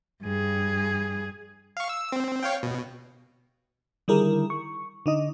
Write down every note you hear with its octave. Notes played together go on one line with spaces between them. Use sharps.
G2 G#4
F5 C#6
E6
C4
C#5 F5 G5
B2
D3 D#3 G3 E4 G#4 A#4
C#6
D3 D#4 D#5